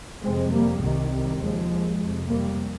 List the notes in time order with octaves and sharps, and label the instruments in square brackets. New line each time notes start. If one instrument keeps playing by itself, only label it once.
[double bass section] F2 C3 G#3 C4
G3 A#3
C2 C3 D#3 G3
D#2 F3 G#3
F2 C3
G3 A#3